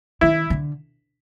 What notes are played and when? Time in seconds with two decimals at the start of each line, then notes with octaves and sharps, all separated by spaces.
0.21 D#3 E4
0.50 D3